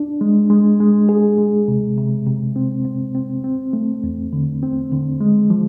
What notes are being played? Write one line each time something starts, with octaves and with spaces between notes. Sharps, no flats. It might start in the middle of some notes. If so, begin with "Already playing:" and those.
Already playing: D4
G#3
G#3
G#3
G#4
G#3
C3
C3
C3
C4
C4
C4
C4
A3
E2
D3
C4
D3
G#3
F3